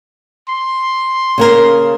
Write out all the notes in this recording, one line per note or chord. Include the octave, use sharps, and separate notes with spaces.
C6
C#3 A#3 A#4